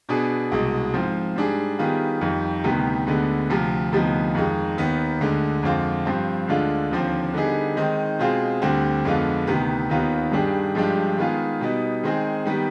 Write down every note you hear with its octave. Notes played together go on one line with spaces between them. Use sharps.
B2 B3 D4 G#4
C2 B2 G#3
G#2 F3 C4
G#2 G3 D4 G#4
D#3 G3 B3 F4 G#4
F2 D#3 G3
D2 C3 D#3 G3 B3
D2 D3 G#3 B3
D2 C3 F3
D2 C3 F3 B3 D#4
F2 D#3 G#3
D#2 D#3 B3
D2 D3 G#3
F2 D3 G#3 C4 F4
G2 F3 C4
D2 D3 G#3 D4 F4
D#2 D3 F3 C4
D3 G3 B3 D#4 G#4
D#3 G#3 C4 D#4
B2 G#3 C4 F4 G#4
D2 D3 G3 C4
F2 D3 G#3 B3 F4
D2 C3 D#3 B3
D#2 D#3 B3 F4
G2 D#3 G3 D4 G#4
G2 F3 G#3 D4 G4
D#3 G#3 B3 F4 G#4
B2 G3 B3 D#4
D#3 G#3 C4 D#4 G#4
D#3 G3 B3